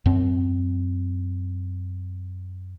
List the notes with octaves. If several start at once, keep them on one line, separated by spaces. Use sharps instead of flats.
F#2 C4